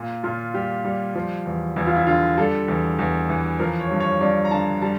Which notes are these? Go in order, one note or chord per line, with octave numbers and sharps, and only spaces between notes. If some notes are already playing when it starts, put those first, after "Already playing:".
Already playing: A#2
A#2 F4
G3 G4
G3
F3
E2
E2 E4
F4
E4
D3 F4
G3 A4
E2
E2
E3
F3 A#4
C#5
G2
C#5
G2 D5
A#5
D3 A5
G3 A5